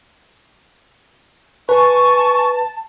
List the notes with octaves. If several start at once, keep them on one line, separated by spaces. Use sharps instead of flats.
B4 G#5 A5 C#6